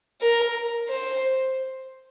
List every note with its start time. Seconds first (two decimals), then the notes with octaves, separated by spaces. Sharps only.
0.21 A#4
0.89 C5